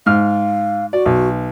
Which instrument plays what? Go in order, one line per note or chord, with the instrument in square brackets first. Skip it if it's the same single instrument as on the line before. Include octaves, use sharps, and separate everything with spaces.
[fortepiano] G#2 F6 [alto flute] F5
[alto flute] F#4 [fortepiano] D5
[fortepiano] B1